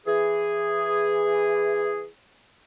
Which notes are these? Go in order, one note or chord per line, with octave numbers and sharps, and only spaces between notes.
E3 G#4